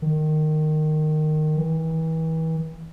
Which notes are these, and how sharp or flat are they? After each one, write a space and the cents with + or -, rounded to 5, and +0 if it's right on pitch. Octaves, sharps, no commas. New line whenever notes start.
D#3 -15
E3 -35